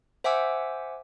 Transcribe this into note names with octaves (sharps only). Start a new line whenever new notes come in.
C5 E5 F#5 G#5 D6 E6